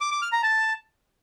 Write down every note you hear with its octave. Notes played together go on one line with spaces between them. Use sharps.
D6
D6
F6
A#5
A5